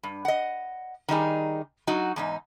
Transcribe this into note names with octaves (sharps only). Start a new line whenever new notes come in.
G2
D#5 F#5
D#3 G3 D#4 G#4
F#3 D#4 F#4
E2 G#2 D#4